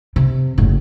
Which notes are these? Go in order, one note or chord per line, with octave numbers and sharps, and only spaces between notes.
C3
F#1 A2